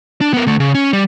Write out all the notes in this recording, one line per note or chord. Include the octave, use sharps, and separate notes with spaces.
D4
B3 A#4
D2 A3
C#3
C#4
G3